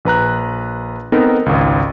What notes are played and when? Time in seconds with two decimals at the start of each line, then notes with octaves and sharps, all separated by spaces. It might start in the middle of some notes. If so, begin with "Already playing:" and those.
0.05 A#1 B4 A#5 F#6
1.12 B3 C4 D#4 A4 A#4
1.46 G#1 C#2